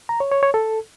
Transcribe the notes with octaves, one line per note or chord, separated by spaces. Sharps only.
A#5
C#5
C#5
C#5
A4